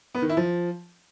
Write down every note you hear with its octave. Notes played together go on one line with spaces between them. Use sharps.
B3
D#3
E4
F3